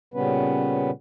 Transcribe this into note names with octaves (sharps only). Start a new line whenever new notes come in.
A#2 C#3 G3 B3 C#4 B4